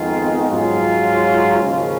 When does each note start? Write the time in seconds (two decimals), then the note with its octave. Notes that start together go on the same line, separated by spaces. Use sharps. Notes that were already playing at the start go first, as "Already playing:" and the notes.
Already playing: F2 D#3 G#3 B3 F4
0.49 G#2 F#3 C#4 F4
1.62 D#2 C#3 F3 G#3 C#4